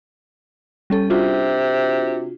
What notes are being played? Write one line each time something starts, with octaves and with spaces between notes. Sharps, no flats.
G3 C#4 A4
C3 D4 F4 F#4